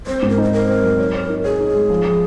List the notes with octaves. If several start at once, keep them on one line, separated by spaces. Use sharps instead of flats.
C4 C5
G#2
A#4
D#4 C5
C4 A#4
C4
F#3
C#5
C#5
D#4
G#4 C#5
D#4
G#3
F3
F3